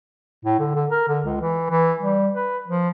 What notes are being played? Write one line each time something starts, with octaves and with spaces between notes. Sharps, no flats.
A2
D3
D3
A#4
D3
C#2
E3
E3
G3
B4
F3